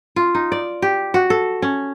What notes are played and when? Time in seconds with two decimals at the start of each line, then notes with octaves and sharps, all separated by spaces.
0.16 F4
0.35 D#4
0.52 D5
0.82 G4
1.14 F#4
1.30 A4
1.62 C#4